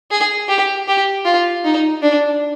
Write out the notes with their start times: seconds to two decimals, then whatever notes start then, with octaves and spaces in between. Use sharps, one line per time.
0.11 G#4
0.49 G4
0.88 G4
1.25 F4
1.64 D#4
2.02 D4